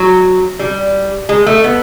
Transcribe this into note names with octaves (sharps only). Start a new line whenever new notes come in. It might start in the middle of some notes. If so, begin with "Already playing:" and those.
Already playing: F#3
G3
G#3
A3
B3